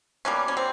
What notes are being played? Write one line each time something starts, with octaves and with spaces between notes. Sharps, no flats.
B2 G3 A#3 B3 C#4
C#4
C4